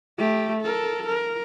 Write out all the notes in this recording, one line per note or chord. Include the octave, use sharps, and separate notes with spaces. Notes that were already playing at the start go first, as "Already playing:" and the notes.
A3 G4
A4 A#4
A#4